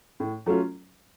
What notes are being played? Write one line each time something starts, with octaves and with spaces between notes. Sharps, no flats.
A2
F#3 A3 C#4 F4